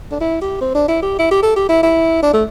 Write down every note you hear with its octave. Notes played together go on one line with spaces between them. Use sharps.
D4
E4
G4
C4
D4
E4
G4
E4
G4
A4
G4
E4
E4
D4
A3